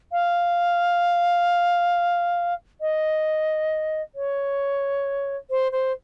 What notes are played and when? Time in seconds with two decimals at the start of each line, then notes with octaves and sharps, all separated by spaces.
0.12 F5
2.81 D#5
4.15 C#5
5.50 C5
5.72 C5